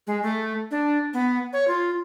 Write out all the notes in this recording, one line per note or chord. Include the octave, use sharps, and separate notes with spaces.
G#3
A3
D4
B3
C#5
F4